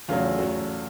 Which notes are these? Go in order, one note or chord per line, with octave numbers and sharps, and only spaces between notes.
E2 C#3 F#3 A3 F4
A3 F#4